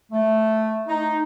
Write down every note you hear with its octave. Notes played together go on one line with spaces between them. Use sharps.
A3
D#4